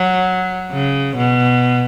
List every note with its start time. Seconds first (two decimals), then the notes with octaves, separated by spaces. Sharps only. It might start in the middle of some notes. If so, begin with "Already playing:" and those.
Already playing: F#3
0.71 C#3
1.17 B2